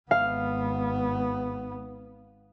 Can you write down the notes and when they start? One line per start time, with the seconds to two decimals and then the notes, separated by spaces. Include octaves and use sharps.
0.11 G#1 B3 F5